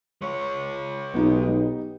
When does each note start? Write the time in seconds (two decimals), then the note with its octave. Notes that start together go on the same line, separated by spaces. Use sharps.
0.22 G#3 C#5
1.14 B1 B3 D#4 G4